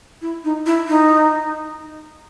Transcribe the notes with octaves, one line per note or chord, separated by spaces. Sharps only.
E4
D#4
E4
D#4